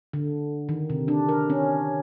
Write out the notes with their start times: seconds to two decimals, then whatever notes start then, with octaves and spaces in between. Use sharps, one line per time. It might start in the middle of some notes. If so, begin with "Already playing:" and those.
0.13 D3
0.69 D#3
0.90 C3
1.08 D4
1.29 A#4
1.50 C#4